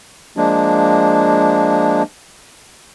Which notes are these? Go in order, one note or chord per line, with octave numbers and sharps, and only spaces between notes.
F3 G#3 A#3 D4